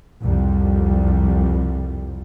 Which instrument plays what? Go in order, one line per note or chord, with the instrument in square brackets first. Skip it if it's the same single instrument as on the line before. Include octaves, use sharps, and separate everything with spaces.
[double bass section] C2 F2 G3